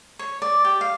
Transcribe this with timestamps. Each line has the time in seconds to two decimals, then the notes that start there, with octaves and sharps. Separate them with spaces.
0.19 C#5
0.42 D5
0.65 G4
0.81 F5